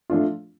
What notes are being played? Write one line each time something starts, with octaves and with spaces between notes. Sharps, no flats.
F3 A3 D4 F4